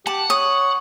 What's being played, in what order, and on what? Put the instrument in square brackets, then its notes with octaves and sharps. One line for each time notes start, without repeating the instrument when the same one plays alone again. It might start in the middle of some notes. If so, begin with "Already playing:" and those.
[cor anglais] G4 [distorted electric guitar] F#5 [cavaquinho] A5
[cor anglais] C#5 [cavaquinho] D#6